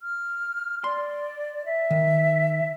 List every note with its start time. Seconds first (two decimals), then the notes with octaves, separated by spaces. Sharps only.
0.01 F6
0.84 D5 C6
1.66 E5
1.91 D#3